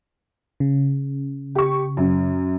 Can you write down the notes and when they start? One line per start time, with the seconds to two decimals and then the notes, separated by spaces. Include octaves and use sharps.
0.60 C#3
1.55 G4 C#6
1.97 F#2